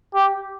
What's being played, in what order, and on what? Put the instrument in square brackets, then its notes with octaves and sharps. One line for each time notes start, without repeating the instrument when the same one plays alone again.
[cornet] G4